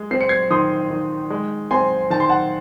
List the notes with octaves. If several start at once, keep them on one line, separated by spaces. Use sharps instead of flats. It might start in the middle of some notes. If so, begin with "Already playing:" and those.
Already playing: G#3
C4 C7
C#7
G#6 C7
D#3 C6 D#6
D#3
G#3
C4 G#5 C6
D#3 A5
C6
F#5 A5